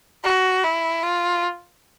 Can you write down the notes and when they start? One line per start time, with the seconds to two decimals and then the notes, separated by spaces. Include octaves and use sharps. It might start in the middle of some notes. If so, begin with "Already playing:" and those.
0.24 F#4
0.64 E4
1.03 F4